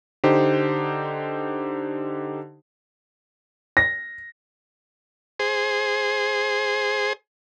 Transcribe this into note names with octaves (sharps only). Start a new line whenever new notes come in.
D3 D#4 G4 C5
A#6
G#4 C5